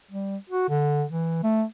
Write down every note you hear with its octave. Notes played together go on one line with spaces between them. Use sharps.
G3
F#4
D3
E3
A3